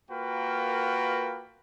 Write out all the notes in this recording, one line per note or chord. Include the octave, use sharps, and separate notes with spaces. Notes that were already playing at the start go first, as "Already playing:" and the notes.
A#3 F4 F#4 A#4 B4 G5